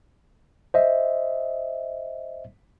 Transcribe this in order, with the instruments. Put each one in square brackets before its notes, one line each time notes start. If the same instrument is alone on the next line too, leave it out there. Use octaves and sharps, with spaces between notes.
[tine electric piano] C5 D#5 E5